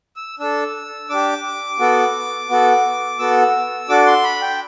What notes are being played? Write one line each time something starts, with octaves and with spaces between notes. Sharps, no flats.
E6
D4 A4 E6
D4 G4 D6
B3 F#4 A4
B3 F#4 A4
B3 F#4 A4 E6
D4 F#4 A4 D6
C6
B5
G5